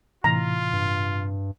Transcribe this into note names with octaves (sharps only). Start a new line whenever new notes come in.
A2 C3 E3 F4 A#5
G2